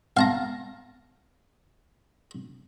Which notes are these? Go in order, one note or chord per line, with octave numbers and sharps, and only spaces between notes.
F5 A5 A#5